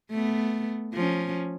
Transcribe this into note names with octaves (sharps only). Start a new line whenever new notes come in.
A3 B3
F3 C#4